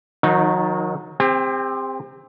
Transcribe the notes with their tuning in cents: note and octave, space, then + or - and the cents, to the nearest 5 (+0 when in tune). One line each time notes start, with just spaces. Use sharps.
D#3 +20 F#3 -25 D#4 -10
C4 +0 G4 +40